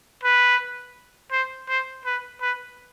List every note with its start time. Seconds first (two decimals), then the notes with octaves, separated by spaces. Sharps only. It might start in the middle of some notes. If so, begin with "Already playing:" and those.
0.24 B4
1.32 C5
1.69 C5
2.05 B4
2.41 B4